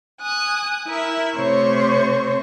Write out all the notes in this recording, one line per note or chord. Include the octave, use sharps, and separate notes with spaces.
G#5 D#6 F#6
E4 A#4 E5
C3 A3 C5 C#5 C#6